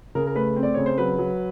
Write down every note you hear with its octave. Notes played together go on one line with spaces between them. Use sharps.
C#3 A#4
A#4
A3 B4
C4
D5
C#3 C#5
C5
F#3 B4
F#3